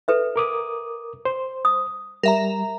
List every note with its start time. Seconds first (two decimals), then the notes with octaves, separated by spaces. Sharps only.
0.08 A4 B4 E5
0.36 A#4 D6 D#6
1.25 C5
1.65 D#6
2.23 G3 A#4 E5 A#5